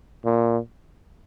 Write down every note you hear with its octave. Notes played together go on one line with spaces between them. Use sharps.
A#2